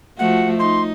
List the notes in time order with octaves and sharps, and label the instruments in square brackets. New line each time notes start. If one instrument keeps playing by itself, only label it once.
[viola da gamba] F3 A3 F#4 [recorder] F#5
[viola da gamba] D#4 [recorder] C6